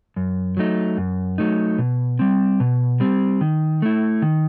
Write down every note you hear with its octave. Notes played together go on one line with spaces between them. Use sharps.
F#2
F#3 A3 D#4
F#2
F#3 A3 D#4
B2
G3 C4
B2
G3 C4
D#3
A3 E4
D#3